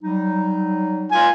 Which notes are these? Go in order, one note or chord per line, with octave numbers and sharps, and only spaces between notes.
F#3 G3 D#4
F4 G#5